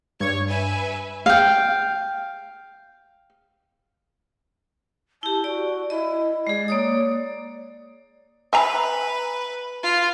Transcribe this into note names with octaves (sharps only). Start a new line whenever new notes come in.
G2 C#5 C#6 G#6
B4 E5 G#5
F5 G5
E4 G4 A5
F#4 D5
E4 D#5
G#3 G#4 D5
A#3 C#5 D#6
B4 E5 G#5 A#5
F4